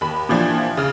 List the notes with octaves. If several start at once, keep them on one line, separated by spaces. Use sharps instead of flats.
D#2 B5
A#2 E3 F3 D4 G4
C#3 F6